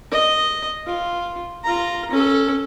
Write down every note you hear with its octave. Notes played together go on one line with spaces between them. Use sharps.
D#5
F4
F4 A#5
C#4 A4